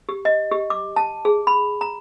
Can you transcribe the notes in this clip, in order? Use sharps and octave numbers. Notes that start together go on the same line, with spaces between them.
G4
D#5
G4
D6
A5
G#4
B5
A#5